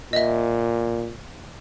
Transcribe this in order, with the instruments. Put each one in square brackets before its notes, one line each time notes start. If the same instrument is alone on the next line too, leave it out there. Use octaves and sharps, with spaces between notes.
[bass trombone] A#2 [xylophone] D#5 E5